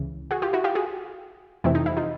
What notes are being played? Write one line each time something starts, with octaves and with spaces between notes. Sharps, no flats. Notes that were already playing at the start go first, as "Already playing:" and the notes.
Already playing: C#2 C#3 E3
F#4 G#4
F4 G4
E4 F#4
F4 G4
F#4 G#4
F2 C3 E3 A3 C4 E4
D#4
E4
D#4 F4